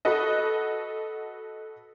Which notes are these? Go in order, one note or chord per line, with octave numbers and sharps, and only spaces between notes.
F#4 A4 B4 D#5